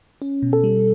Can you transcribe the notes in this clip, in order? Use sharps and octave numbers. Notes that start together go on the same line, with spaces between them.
C#4
B2
A4
G3